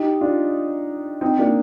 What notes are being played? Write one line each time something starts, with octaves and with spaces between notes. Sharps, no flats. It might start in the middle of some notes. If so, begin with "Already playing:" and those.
Already playing: D#4 G4
D4 F4
C4 D#4
A#3 D4